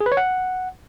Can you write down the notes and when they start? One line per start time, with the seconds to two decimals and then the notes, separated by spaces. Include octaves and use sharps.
0.01 G#4
0.06 B4
0.12 C#5
0.17 F#5